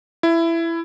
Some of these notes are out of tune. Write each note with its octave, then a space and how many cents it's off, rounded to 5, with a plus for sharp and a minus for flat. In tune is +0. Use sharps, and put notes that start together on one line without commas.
E4 +15